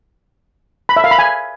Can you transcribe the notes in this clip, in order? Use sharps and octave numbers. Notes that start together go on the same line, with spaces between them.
B5
E5
F5
B5
G#5